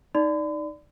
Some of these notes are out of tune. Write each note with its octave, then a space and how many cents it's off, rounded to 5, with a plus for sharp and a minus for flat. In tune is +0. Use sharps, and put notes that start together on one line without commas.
D#4 +0 D5 +0 B5 +45